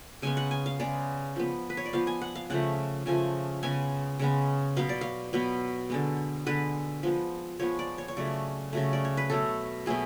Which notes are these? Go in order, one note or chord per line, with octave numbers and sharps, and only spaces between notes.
C#3 G#3 B3 G#5
F#5
G#5
F5
C#3 G#3 B3 D5
F3 B3
B4
C#5
D5
F3 B3 F5
G#5
F#5
F5
C#3 F3 A3 F#5
C#3 F3 A3 G#5
C#3 G#3 B3 G#5
C#3 G#3 B3
B2 F#3 B3 F5
D5
F5
B2 F#3 B3
D3 G#3 B3
D3 G#3 B3 B4
F3 G#3 B3
F3 G#3 B3 C#5
D5
C#5
C#5
C#3 F#3 A3 D5
C#3 F#3 A3
D5
C#5
B4
B2 F#3 A3 A4
B2 F#3 A3 G#4